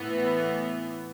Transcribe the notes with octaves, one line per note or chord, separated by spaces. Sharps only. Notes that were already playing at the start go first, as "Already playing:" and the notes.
Already playing: A2 E3 B3